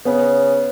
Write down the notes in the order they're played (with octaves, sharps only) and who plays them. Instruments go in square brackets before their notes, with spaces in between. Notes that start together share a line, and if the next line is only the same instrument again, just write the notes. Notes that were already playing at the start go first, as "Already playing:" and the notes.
[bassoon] C#3 [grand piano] B3